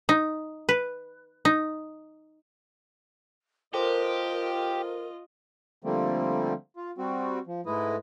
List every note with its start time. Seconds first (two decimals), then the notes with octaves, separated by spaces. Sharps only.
0.09 D#4
0.69 B4
1.45 D#4
3.74 F4 G4 A4 A#4 C5 D#5
5.84 D3 F3 G3 A3 A#3 C4
6.77 F4
6.98 G3 C4 F#4
7.47 F3
7.66 G#2 G#3 A3 E4 B4 D#5